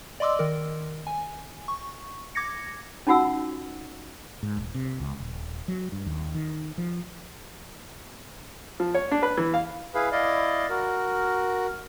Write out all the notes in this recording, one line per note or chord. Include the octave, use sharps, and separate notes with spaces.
D5 D#5 C6 D6 E6
D#3 A#4
G#5
C#6
D6 G#6 A#6 C#7
C#4 D#4 F4 F#4 F#5 E6
G#2
D#1
C3
C#2
D#1
F#3
G2
D#2
D#3
F3
F3
C#5
D4
B4
E3
F5
E4 G#4 B4 F5
E4 D5 D#5 F5
F#4 A#4